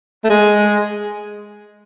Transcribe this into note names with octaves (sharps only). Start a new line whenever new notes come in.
A3
G#3